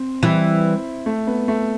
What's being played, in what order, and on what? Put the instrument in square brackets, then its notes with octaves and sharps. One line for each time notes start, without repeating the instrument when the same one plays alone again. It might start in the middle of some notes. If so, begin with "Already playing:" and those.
Already playing: [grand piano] C4
[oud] E3 G3 [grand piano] E4
[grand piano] A3
B3
A3